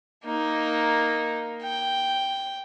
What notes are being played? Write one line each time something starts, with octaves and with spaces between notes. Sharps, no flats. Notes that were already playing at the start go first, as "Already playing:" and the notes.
A#3 D#4
G5